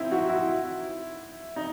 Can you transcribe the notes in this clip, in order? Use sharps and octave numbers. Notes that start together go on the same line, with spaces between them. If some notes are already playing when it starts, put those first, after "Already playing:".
Already playing: C4 D#4 E4
F#4
E4
D#4